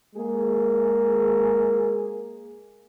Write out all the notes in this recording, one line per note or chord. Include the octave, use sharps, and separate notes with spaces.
G#3 A#3 G#4